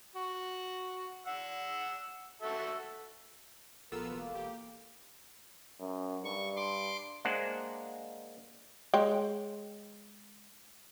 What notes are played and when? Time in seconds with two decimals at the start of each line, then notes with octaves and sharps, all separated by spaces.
0.15 F#4
1.27 F#5 E6
2.42 F#4 A4 E5
3.92 A#1 B3 F4 A4 A#4 E6
4.12 E1 A#3
4.35 G4
5.80 F#2
6.24 G2 C#6
6.56 C6 D6
7.25 G#3 A#3 D4 C5 F#5
8.94 G#3 C#5 G5